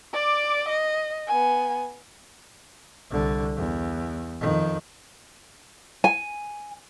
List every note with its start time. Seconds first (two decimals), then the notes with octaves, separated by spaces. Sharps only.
0.13 D5 D6
0.69 D#5
1.27 B3 G#5
3.10 C2 D3
3.56 E2
4.40 F2 D#3
6.04 G#5